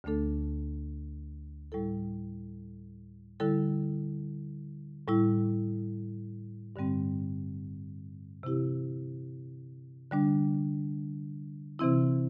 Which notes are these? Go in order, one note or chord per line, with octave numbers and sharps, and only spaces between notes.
D2 D3 A3 D4 A4
A2 G3 E4 A4
D3 G3 E4 A4
A2 G3 E4
G2 D3 G3 C4
C3 E3 C4 E4 G4
D3 G3 D4
C3 E3 C4 E4